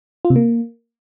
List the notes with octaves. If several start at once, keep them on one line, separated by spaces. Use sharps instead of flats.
F4
C3
A#3